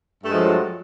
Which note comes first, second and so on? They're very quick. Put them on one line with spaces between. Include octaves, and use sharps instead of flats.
G2 A3 G#3 F3 F#3